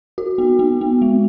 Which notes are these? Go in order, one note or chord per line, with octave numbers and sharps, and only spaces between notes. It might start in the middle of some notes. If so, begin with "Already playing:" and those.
F#4
B3
B3
B3
G#3